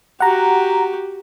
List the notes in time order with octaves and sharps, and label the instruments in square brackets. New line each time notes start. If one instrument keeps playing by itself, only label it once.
[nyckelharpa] F#4 G4 [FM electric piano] F#5 A#5